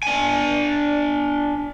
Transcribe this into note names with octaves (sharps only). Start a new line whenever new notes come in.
D4 G#5